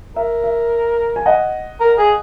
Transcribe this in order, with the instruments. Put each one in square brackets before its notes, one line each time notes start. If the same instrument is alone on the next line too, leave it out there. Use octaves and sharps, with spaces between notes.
[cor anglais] A#4 [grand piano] E5
[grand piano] E5
G#5
D#5 F#5
[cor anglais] A#4
G#4